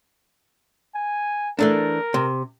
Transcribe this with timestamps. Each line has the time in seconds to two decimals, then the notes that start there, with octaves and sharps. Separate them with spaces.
0.95 G#5
1.59 E3 A3 D4 A#4
2.14 C3